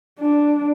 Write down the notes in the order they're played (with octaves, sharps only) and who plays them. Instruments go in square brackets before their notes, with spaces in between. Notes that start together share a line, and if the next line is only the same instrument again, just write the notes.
[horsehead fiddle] D4